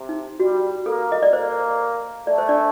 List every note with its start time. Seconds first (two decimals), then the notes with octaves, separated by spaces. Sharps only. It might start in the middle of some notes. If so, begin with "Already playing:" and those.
Already playing: C3
0.09 D#4
0.40 G3 F#4
0.86 A#3 A4
1.12 D#5
1.23 D5
1.33 A#3 C5
2.27 A3 D5
2.38 C5
2.49 D4 D5